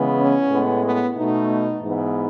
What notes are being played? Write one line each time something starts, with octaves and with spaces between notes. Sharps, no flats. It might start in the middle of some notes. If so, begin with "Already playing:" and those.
Already playing: C#3 E3 G#3 B3
C#4
A2 G#3 B3
B3
B2 A3 D#4
G#2 E3 B3